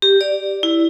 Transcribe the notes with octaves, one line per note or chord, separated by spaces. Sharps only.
G4
D5
E4